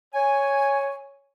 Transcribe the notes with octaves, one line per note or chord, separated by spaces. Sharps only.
C#5 G#5